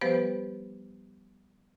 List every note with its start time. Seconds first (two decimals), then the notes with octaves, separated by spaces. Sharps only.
0.01 F3 G3 B3 G4 B4 C5